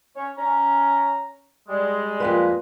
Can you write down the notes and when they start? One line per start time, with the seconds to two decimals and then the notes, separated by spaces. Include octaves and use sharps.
0.16 C#4 C#5
0.37 C#4 A#5
1.67 G3 G#3
2.20 F2 A#3 B4